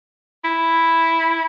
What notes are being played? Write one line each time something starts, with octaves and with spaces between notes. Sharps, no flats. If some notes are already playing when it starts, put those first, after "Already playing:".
E4